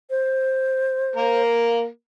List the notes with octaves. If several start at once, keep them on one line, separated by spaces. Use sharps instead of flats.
C5
A#3 A#4